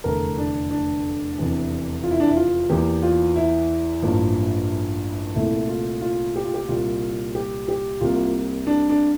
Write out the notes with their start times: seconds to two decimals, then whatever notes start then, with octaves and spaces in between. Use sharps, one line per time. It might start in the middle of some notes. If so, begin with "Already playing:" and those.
0.04 F1 E2 D3 A3 A#4
0.38 D4
0.70 D4
1.38 F1 E2 C3 E3
2.03 F4
2.11 E4
2.20 D4
2.27 E4
2.36 F4
2.70 E2 E3 A#3 G4
3.03 F4
3.36 E4
4.02 A1 G2 F3 A#3
5.35 C2 A#2 A3 E4
5.68 F4
6.01 F4
6.36 G4
6.45 F4
6.54 G4
6.68 C2 A#2 G3 A#3 F4
7.35 G4
7.68 G4
8.01 C2 C3 G3 A#3 F4
8.67 D4
8.89 D4